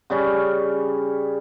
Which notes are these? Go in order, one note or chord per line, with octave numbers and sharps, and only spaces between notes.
C#3 G3 C#4